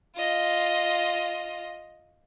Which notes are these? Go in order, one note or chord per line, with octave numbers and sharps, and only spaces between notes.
F4 D#5